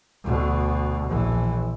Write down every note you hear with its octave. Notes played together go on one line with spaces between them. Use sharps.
D2 B2
A#1 E3